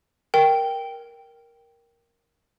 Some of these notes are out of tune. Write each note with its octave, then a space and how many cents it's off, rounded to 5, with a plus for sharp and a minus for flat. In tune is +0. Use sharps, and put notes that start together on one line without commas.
A#4 +5 G5 +0